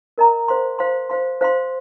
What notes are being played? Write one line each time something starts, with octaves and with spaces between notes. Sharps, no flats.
A#4 D#5 A#5
C5 F5 C6
C5 F5 C6
C5 F5 C6
C5 F5 C6